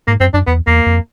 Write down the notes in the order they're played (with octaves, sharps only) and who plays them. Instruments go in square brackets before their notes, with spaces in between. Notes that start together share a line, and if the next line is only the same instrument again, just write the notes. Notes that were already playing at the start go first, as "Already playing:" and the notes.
[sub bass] G#2 [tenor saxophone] A#3
[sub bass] F#2 [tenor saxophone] C4
[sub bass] F#2 [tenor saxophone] D4
[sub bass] E2 [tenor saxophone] B3
[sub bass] E2 [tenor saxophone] A#3
[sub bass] F2